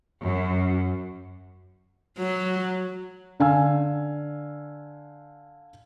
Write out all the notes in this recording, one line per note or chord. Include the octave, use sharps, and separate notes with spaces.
F#2
F#3
D3 F5 G#5 E6